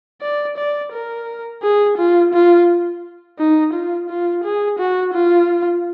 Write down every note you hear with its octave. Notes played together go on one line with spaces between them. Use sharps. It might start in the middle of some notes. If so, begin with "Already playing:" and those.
D5
D5
A#4
G#4
F4
F4
D#4
F4
F4
G#4
F#4
F4